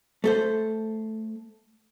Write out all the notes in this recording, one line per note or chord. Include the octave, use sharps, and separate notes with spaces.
A3 A4 C5